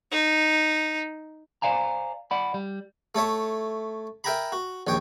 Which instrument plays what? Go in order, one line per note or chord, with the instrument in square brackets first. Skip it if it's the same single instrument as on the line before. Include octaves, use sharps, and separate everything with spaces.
[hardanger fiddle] D#4
[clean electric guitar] C5 D5 F5 G#5 A#5
D5 F#5 B5
G3
[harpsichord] A3 A4 C#5 E5
A#4 E5 G5 G#5 A#5 B5
F#4
A#1 D#2 C#5 G5